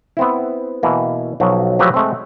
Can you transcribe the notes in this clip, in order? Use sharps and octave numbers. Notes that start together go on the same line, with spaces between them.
B3 C4 E4
B2 E3 A#3
B1 F3 F#3
F3 F#3 A3 G4 B4 E5
G#3 A3 C4